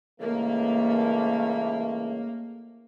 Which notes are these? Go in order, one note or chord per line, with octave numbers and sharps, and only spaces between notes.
C#2 E3 A3 A#3